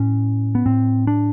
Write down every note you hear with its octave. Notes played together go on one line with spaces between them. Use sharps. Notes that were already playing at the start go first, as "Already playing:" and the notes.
Already playing: A2 C#4
B3
A2 C4
D4